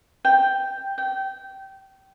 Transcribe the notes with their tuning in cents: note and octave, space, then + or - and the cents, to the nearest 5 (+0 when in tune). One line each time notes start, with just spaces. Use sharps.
G5 +0
G5 -20